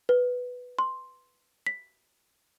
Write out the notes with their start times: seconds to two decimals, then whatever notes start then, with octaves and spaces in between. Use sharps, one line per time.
0.09 B4
0.79 C6
1.66 B6